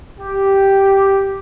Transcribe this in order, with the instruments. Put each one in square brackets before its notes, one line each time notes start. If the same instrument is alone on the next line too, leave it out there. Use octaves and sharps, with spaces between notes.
[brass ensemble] G4